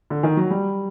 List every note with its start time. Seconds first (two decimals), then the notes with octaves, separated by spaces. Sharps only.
0.10 D3
0.23 D#3
0.37 F#3
0.50 G3